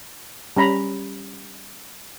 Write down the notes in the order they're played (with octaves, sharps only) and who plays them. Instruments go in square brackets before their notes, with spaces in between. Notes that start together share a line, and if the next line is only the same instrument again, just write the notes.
[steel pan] G3 C#4 A#5 B5